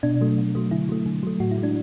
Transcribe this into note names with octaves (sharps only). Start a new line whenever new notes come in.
B2 D4
F#3 A3
B2
F#3 A3
D3 E4
F#3 A3
D3
F#3 A3
A2 F#4
E4
G#3
D4